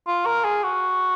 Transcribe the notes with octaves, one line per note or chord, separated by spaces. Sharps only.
F4
A#4
G#4
F#4